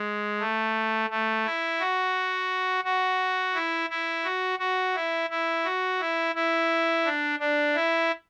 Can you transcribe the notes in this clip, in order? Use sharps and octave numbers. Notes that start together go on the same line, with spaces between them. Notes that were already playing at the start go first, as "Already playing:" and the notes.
Already playing: G#3
A3
A3
E4
F#4
F#4
E4
E4
F#4
F#4
E4
E4
F#4
E4
E4
D4
D4
E4